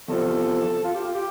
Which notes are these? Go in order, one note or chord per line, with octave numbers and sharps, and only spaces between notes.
E2 C3 F3 A4
F4
G4
F4
G4